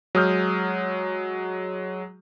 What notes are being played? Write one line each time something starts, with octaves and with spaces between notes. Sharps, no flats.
F#3 G#3 D#6 F6 G6